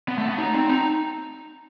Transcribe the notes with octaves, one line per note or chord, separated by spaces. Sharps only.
B3
A3
B3
D#4
C4
D#4